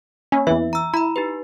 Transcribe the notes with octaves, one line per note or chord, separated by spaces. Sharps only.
A#3 C#4
E2 E3 E5
A#5 E6
E4 A#5 B5
D#4 G4 B4